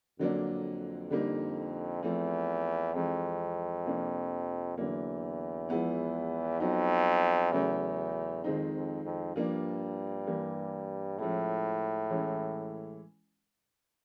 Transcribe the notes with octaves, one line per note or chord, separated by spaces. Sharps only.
F2 D3 F#3 A#3 D4
D3 G3 A#3 D#4
E2 F3 A3 C4
F2 E3 G#3 C4
C3 F3 A#3 D4
E2 D3 F#3 A#3
F3 G#3 B3 E4
F2 F#3 B3 D#4
E2 C#3 F#3 A3
F2 D#3 G#3 C4 D#4
F2
F2
G2 F3 A#3 D4
E3 G3 A#3
A2 F3 G#3 C#4 E4
E3 G#3 C#4 E4